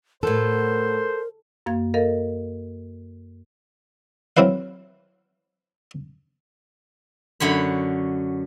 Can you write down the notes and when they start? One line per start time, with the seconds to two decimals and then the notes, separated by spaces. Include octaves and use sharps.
0.23 A2 F#3 A4 A#4 C5
1.66 F#2 A#3 F5 G#6
1.94 A4 A#4 D#5 F5
4.37 F#3 C4 E4 B4 F5
7.40 F#2 D3 C#5 B5